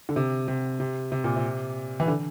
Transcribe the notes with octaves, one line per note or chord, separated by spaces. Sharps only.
D3
C3
C3
C3
C3
A#2
C3
E3
D3